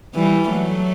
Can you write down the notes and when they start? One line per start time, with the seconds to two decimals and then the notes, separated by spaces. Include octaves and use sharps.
0.15 E3 G3
0.50 F#3 A3